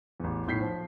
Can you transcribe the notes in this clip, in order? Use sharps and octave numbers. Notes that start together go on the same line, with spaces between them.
A1 E2
B1 A2 G6 B6 C7
F3